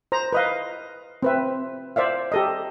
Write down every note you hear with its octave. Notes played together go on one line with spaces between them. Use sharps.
C5 A#5
B4 D#5 F5
C4 B4 E5
C5 D5 E5 F5
G4 A4 D#5